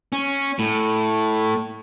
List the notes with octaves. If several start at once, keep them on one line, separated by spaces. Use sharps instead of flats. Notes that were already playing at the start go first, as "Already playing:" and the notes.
C#4
A2